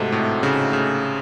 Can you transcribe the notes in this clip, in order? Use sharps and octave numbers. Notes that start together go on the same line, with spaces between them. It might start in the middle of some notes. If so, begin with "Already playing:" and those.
Already playing: G#2 C3 A3 C4 D#4 F#4 A4
A2
C#3
C#3